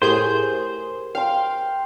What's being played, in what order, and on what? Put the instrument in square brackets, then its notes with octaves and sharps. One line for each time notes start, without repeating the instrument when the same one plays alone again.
[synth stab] A2 G#4 G6 [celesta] G4 A#4 [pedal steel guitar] C5
[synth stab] F5 [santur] G5 C6